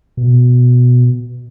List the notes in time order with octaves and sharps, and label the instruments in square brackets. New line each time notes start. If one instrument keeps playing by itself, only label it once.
[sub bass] B2